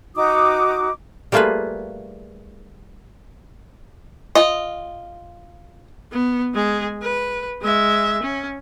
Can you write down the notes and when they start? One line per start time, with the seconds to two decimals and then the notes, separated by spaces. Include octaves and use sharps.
0.15 D#4 F#4 D6 D#6
1.32 G3 A3 A#3 F4 G#4 B4
4.35 F4 D#5
6.12 B3
6.54 G#3 G#4
7.02 B4
7.62 G#3 E5
8.23 C#4